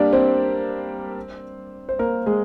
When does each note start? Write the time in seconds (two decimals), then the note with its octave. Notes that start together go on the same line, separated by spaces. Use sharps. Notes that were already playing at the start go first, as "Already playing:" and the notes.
Already playing: G3 A#3 D4 G4 A#4 D5
0.13 C4 C5
1.89 C5
1.99 A#3 A#4
2.26 G#3 G#4